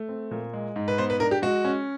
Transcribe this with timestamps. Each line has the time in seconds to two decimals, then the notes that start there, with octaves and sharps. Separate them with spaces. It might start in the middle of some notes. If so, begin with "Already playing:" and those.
Already playing: A3
0.09 C4
0.31 A#2
0.53 G#3
0.76 G#2
0.88 B4
0.98 B3 C5
1.10 B4
1.20 D4 A#4
1.31 G4
1.42 G#3 F#4
1.65 C#4